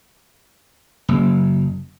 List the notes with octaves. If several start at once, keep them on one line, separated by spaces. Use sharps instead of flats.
F#1